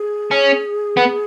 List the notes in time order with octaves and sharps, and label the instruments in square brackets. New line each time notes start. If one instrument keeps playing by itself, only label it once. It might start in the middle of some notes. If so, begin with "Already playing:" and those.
Already playing: [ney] G#4
[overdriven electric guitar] C#4
B3